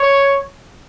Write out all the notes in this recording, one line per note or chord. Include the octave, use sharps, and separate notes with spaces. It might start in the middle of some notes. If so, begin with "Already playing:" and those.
Already playing: C#5